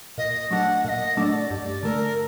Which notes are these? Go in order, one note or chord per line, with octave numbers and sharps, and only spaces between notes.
A#2 D#5
F#3 A3 D4 F#5
A#2 D#5 F#5
F#3 A3 D4 D5 D#5
G2 D5
D3 A3 A#4